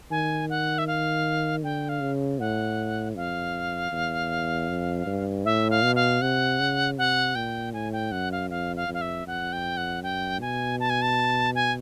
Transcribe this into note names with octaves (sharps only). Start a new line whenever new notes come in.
D#3 G#5
F#5
E5
F5
D3 G5
F5
C#3
A2 F#5
F2 F5
E2
F2
G2
A2 E5
F5
B2
F5
C3 F#5
C#3
C3 F#5
A#2 G5
A2 G#5
G5
F#2 F#5
F5
F2 F5
F5
F2
F5
E5
F2 F#5
G5
F#5
F#2 G5
B2 G#5
A5
G#5
A5
G#5